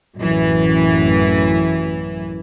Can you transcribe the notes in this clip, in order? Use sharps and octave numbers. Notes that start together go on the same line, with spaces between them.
A1 F#2 E3